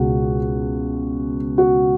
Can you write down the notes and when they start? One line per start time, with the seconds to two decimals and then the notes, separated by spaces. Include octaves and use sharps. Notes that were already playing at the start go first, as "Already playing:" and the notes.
Already playing: C#2 B2 G#3 F#4
1.58 F#4